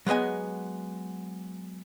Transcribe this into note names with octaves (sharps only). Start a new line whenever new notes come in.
F#3 G#3 B3 D#5 G#5